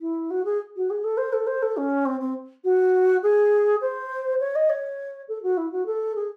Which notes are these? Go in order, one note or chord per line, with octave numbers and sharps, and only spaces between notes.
E4
F#4
G#4
F#4
G#4
A4
C5
A4
C5
A4
C#4
C4
C4
F#4
G#4
C5
C#5
D#5
C#5
A4
F#4
E4
F#4
A4
G#4